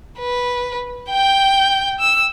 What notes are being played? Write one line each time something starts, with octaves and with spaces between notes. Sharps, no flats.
B4
G5 G6
E6